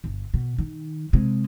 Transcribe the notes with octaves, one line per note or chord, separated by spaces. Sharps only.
G1
B2
D#3
C3 G#3